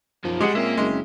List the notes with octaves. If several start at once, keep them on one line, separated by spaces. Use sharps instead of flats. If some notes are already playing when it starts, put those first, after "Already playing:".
F#2 D#3 F3
G3 G#3 G4 G#4 F#5
A#2 A#3 C4 C#4 E5
F#1 G#3